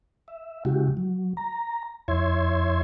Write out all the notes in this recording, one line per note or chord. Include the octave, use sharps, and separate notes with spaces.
E5
C#3 G#3 E4 F#4 G4
F#3
A#5
F2 E4 C#5 E5 C6 G#6